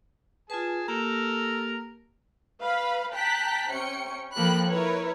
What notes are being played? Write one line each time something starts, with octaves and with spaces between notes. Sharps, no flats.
F4 G#4 B4 A5
A#3 G4 A4 A#4 A#5
B4 F5 B5
G5 A5 A#5 F#6 B6
C3 C#4 G5 C#7
F3 A#3 A4 G5 B5 F#6
E4 A#4 B4 C#5